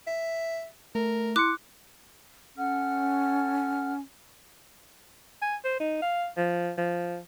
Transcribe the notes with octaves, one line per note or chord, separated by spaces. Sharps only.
E5
A3 A#4
E4 C6 D6 F#6 C#7
C#4 A4 F#5 F6
G#5
C5
D#4
F5
F3
F3